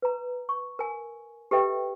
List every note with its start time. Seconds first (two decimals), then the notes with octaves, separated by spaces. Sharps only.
0.02 B4 A#5
0.49 C#6
0.79 A#4 G#5
1.51 G4 A4 B4 D#5 E5 G5